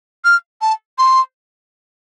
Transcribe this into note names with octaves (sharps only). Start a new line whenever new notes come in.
F6
A5
C6